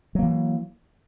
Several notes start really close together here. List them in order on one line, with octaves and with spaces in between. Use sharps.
F#3 A#3 E3